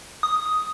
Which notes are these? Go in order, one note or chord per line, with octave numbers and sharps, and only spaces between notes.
D#6